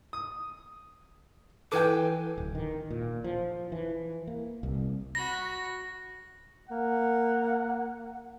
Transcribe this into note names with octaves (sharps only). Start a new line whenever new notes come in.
D#6
E3 A4 B4 G5 G#5 D6
D1
D#3
A#2
F3
E3
A#3
C2
F#4 B5 A#6
A#3 F#5